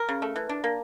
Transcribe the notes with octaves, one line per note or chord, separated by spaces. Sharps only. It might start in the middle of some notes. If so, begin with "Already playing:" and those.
Already playing: A#4
C#3
A3
E3
D4
A#3